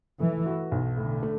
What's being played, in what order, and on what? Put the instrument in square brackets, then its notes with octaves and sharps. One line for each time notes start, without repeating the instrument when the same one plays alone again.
[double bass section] E3 [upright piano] A3
[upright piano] F#4
B1
[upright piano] A2 [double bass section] D3
[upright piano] A3